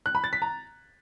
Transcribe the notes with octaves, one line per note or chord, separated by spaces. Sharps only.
F#6
B5
A6
B6
A#5